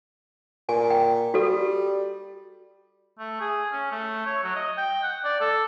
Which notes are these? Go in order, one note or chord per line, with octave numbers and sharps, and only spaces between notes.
A#2 G#5
G5
G3 F#4 G4 A4
A3
G#4
C#4
A3
C#5
F#3
D#5
G5
F#5
D5
A4